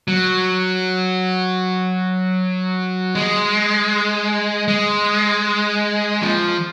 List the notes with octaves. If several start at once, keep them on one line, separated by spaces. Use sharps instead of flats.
F#3
G#3
G#3
F3